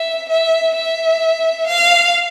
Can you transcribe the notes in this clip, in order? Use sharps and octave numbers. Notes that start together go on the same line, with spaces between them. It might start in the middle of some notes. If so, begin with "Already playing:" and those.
Already playing: E5
E5
E5
F5